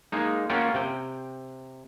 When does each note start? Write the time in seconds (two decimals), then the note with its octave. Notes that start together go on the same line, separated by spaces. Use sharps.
0.12 G#3 A#3 D#4
0.50 A#3 C#4 F4 A#4 F#5 G5
0.74 C3 G5